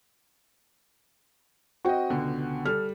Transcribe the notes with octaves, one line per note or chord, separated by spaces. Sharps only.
C4 F#4 D#5 G5
C#2 B2 D3
G3 A4 F6